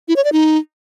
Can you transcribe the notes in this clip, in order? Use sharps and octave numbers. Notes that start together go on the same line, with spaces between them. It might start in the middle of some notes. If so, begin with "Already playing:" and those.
E4
C#5
D5
D#4